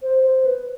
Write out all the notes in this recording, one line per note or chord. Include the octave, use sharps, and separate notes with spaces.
C5
C5
B4